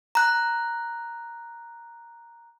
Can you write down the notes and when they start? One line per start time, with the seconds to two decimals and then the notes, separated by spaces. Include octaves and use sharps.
0.15 A#5 F#6